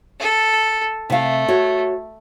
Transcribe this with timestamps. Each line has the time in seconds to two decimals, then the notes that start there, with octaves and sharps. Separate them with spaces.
0.20 A4
1.10 C3 A3 F5
1.48 F#4 C#5